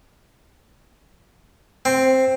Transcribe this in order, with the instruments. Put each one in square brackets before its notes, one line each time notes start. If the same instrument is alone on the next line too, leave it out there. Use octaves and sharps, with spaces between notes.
[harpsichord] C4